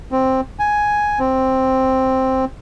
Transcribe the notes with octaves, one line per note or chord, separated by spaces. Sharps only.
C4
G#5
C4